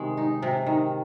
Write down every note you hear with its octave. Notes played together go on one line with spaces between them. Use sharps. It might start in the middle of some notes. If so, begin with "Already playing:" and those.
Already playing: C3 D#3 G#3
D#4
C3
D#3